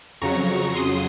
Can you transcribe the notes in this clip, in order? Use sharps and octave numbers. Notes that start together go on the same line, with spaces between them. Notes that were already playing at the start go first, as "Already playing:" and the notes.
F2 C#3 F#3 A#5 C#6
C6 D#6